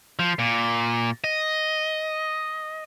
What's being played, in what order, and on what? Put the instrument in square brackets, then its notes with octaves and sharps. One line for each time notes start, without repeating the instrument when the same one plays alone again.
[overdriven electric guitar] F3
A#2
D#5